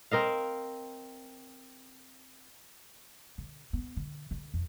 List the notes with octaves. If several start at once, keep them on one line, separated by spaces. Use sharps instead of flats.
C4 A#4 D#5 F5
D3
B3
D3
D3
F2